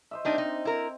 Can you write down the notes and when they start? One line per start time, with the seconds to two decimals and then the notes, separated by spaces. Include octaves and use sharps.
0.11 C5 D#5 E5
0.25 G3 C4 D4 D#4
0.38 D#4
0.65 E4 A#4